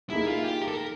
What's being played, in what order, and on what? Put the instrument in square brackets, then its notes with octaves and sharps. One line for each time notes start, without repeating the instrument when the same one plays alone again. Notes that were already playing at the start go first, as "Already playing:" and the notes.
[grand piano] A#3 D#4 G#4 [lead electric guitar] E4
[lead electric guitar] F4
G4
A#4
A4
A#4